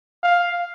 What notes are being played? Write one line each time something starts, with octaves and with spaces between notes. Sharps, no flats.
F5